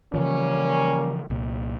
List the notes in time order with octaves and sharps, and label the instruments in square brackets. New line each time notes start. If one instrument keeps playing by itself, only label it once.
[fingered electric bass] C#3 E3 F3 [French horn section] G3 A#3 C#4
[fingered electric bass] C2 A#2